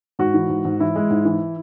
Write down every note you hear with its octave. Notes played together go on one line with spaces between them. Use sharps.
G#2 F#4
E3
G#2
G#2
E3 E4
G#3
G#2
E3